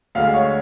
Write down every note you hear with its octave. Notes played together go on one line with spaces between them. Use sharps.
D2 D3 G#3 F5
C#5